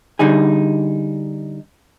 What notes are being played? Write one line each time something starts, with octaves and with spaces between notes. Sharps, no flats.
D3 G3 D#4 G#4